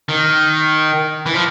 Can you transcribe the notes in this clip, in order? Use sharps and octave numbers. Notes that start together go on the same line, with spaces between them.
D#3
E3
F3